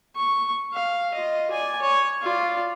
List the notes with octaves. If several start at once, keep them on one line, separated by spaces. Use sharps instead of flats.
C#6
F5
F4 D#5
D5 G#5
C#5
F4 D5